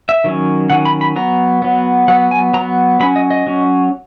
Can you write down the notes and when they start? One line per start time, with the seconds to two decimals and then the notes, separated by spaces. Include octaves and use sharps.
0.09 E5
0.24 D#3 F#3 C#4
0.70 D#3 F#3 C#4 F#5
0.85 B5
1.01 B5
1.16 F#3 B3 A#5
1.62 F#3 B3
2.08 F#3 B3 F#5
2.31 G#5
2.54 F#3 A#5
2.59 B3
3.00 F#3 C#4 B5
3.16 D#5
3.31 D#5
3.47 F#3 C#4